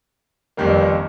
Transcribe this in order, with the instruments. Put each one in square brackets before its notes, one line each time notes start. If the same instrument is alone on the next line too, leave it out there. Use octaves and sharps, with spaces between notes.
[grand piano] G1 F2 D#3 G3 A#3